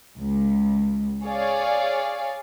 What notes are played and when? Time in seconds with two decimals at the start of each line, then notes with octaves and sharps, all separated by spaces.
0.18 C#2
1.24 G#4 C#5 D5 F5